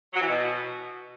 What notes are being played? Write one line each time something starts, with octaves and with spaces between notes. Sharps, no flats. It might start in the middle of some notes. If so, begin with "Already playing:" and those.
F#3
E3
B2